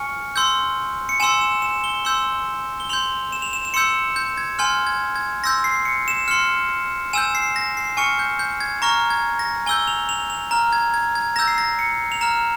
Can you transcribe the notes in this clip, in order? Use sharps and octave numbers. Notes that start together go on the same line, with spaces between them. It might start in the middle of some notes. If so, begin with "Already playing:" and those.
Already playing: G#5 C#6 F6 C#7
C6 E6 G6
C#7
G#5 C6 E6 E7
E7
E7
G7
C6 E6 G6
G7
C6 G6 F7
E7
F7
E7
E7
C6 E6 G6 C#7
G6
G#6
G#5 C6 F6 G6
G#6
G#6
C6 E6 G6 A#6
C7
C#7
E7
C6 F6 C#7
G#5 E6 G6 E7
C7
A#6
C7
G#5 C#6 F6 C#7
G6
G6
G#6
A#5 C#6 F6 A#6
G#6
A#6
G#5 E6 G6 G7
F7
F7
F7
A#5 F6
G#6
G#6
G#6
A#5 E6 G6 A#6
C7
A#6
C#7
F7
A#5 F6 E7